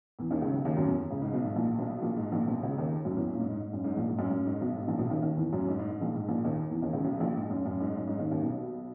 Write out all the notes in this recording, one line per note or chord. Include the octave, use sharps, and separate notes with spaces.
E2 E3
D#2 D#3
C#2 C#3
B1 B2
D#2 D#3
F#2 F#3
E2 E3
C#2 C#3
G#2
B1 B2
G#2
A#1 A#2
B1 B2
A#1 A#2
G#2
A#1 A#2
B1 B2
C#2 C#3
D#2 D#3
F#2 F#3
E2 E3
F#2
A#2
G#2
G#2
G#2
F#2
G#2
A#1 A#2
G#2
F#2
F#2
G#2
B1 B2
G#2
A#1 A#2
B1 B2
D#2 D#3
D#2 D#3
E2 E3
F#2 F#3
G#2
G#2
G#2
A#1 A#2
G#2
A#1 A#2
D#2 D#3
E2 E3
D#2 D#3
C#2 C#3
B1 B2
A#1 A#2
G#2
F#2
F#2
G#2
F#2
G#2
D#2 D#3
D#2 D#3
B1 B2